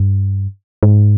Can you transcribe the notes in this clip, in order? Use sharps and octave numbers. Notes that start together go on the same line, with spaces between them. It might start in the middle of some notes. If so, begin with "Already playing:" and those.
Already playing: G2
G#2